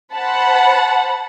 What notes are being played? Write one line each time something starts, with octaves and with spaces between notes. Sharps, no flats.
C5 F#5 A5 B5